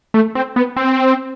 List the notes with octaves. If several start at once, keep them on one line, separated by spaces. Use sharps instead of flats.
A3
C4
B3
C4